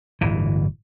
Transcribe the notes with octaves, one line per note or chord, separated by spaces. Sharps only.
D1 G1 E3